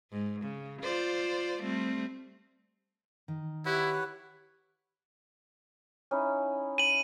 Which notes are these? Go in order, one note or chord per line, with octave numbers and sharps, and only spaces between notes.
G#2
C#3
F4 C5 D5
G3 A3 C4
D#3
E4 G4 B4 C#5 F#5
C#4 D#4 E4
G#5 D#7 F#7